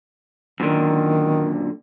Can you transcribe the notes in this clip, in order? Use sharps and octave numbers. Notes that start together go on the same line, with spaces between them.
F#2 A#2 D3 D#3